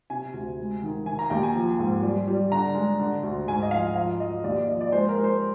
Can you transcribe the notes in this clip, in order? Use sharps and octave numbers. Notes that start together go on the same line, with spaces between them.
C3 G#5
D2
G#3
D#3
D#3 G#5
A#5
D#2 G5
G#5
F3
G#2
G3
G3
D3 A#5
G#3
D3
D2
G#2 G#5
D#5
F3 F5
F3 F5
F3 D#5
D#2 D5
D5
F3 D#5
D5
G#3 C5
A#4
G#3
C5